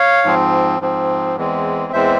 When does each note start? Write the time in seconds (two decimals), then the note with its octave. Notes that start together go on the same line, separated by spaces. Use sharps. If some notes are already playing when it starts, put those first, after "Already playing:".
Already playing: C#5 F5
0.24 G#2 F3 C4
0.80 G#2 F3 C4
1.36 E2 E3 G#3 C4
1.93 E2 E3 G#3 C4 C5 E5